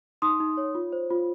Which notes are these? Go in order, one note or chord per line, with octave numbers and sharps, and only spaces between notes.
D#4 C6 D#6
D#4
C#5
F4
C5
F4